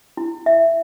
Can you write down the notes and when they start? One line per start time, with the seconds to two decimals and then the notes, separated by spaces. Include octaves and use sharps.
0.17 E4
0.46 E5